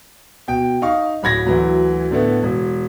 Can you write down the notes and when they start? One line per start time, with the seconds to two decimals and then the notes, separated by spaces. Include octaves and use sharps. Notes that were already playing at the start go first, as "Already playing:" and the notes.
0.48 B2 G5
0.82 D#4 F5 C#6
1.23 D1 B5 G#6 A#6
1.46 D2 E3 F#3
2.11 A2 D3 A3 B3
2.43 E1